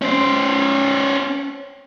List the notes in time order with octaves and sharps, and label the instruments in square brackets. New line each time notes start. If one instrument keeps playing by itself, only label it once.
[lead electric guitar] C#4 C5